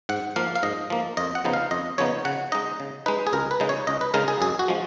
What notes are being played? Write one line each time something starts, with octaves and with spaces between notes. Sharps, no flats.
G#2 F#5
F3 A#3 F5
F5
G#2 D#5
F3 A#3
F2 D#5
F#5
C#3 F3 B3 D#4
F5
F2 D#5
C#3 F3 B3 D#4 C#5
C#3 F#5
G#3 D#4 D#5
C#3
G#3 D#4 B4
G#4
C#2 A#4
B4
C#3 G#3 D#4
C#5
C#2 D#5
B4
C#3 G#3 D#4 A#4
G#4
F#2 G#4
F#4
F3 G#3